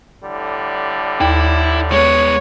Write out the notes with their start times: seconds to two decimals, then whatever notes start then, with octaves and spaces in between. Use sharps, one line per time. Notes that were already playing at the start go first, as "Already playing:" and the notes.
0.23 A2 D3 G3
1.21 D#2 E4
1.92 G#3 B3 C#5